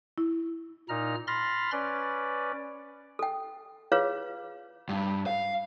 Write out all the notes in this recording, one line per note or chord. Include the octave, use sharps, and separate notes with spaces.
E4
A#2 D#4 A#5 F6
B5 C6 F6 A6 A#6
C#4 B4 D5
A4 G5
F4 G#4 B4 C#5 F5
G2
F5